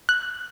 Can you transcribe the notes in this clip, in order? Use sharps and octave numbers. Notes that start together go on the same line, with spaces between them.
F#6